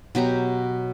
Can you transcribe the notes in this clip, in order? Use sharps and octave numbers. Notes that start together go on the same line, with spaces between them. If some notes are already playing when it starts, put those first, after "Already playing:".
B2 F#3 G4 A#5